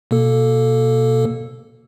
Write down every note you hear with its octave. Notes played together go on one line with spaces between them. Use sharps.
B2 A#3 A4